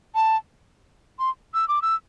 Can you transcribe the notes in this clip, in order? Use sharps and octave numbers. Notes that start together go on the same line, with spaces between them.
A5
C6
E6
D6
E6